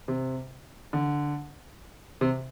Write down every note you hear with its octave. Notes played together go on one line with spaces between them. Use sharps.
C3
D3
C3